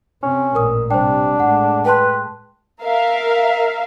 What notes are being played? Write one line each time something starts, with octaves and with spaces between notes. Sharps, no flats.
C3 C4 C#4
A1 A#2 A#4 D#6
C3 G3 D4 C5 G5
A2 G#3 F#5
B4 G5 A5 C6
A#4 E5 F5